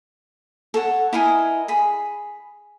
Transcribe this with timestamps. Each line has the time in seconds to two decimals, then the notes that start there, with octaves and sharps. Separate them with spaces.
0.74 A4 C#5 F#5
1.13 E4 A#4 D#5 G#5
1.68 G#4 B5